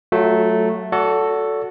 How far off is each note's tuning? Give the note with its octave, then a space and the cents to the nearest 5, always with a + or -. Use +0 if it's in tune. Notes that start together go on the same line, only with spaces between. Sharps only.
F#3 +10 A3 +0 F4 +40
F#4 +0 A4 +5 D5 -40